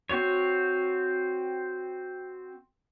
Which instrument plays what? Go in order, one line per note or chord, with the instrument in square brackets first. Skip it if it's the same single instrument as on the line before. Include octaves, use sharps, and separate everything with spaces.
[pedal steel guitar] C4 F#4 C#5